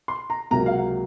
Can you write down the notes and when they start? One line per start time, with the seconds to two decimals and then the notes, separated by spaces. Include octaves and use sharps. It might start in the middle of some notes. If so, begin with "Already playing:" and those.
0.08 C6
0.30 A#5
0.51 C#2 C3 F#3 A#3 A#5
0.66 F5
0.72 F#5